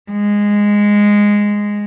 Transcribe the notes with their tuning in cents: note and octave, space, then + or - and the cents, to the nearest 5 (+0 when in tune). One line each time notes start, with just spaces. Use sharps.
G#3 -10